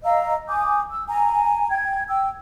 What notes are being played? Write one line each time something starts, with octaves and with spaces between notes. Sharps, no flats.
D#5 F5 A#5 E6
G#5 D6 D#6 G6
E6
G#5 A#5
G5 G#6
G5 E6